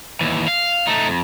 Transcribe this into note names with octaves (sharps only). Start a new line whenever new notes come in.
D#2 E3
F5
A3 D#4
F2